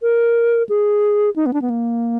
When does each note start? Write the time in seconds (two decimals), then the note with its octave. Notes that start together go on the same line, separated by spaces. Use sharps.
0.02 A#4
0.69 G#4
1.36 D#4
1.46 B3
1.53 D4
1.62 B3
1.70 A#3